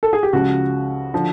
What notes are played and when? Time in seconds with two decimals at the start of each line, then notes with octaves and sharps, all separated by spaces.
0.03 A4
0.13 G#4
0.23 G4
0.33 C#2 C#3 F3 F#4
1.13 D3 F3